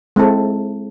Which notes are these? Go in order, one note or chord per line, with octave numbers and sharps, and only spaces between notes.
G#3 C4 E4 A4